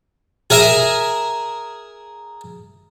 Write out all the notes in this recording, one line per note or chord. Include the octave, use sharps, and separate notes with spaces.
G#4 A#4 E5 G#5